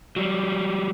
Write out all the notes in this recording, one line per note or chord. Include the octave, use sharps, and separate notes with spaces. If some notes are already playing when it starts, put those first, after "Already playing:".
F#3 G3